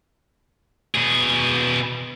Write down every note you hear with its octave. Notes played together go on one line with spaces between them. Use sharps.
B2 G#4